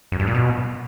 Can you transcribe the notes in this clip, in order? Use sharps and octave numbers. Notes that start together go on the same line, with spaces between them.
F#2
G2
A#2
B2